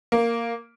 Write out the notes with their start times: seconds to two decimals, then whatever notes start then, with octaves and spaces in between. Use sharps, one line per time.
0.12 A#3